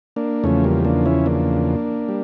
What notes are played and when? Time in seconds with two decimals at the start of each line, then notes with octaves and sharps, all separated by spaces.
0.16 A#3 D4
0.44 E2 C#3 F3 A3 C#4
0.64 G3 A#3
0.85 A#3 D4
1.06 C#4 E4
1.26 A#3 D4
2.09 G3